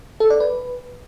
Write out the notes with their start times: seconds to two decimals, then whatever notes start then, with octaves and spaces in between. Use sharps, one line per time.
0.20 A4
0.30 D5
0.40 B4